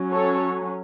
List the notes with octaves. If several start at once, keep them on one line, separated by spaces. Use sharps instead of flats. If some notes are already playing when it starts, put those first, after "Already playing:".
Already playing: F#3 C#4
A4 C#5